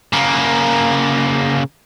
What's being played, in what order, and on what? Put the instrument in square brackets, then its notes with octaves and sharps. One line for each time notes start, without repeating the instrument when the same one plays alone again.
[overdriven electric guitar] C#3 A#3